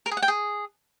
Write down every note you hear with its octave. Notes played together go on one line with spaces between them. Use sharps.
A#4
G#4
F#5
G5
G#4